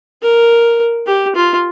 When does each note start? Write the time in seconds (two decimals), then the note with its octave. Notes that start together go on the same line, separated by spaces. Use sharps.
0.22 A#4
1.07 G4
1.35 F4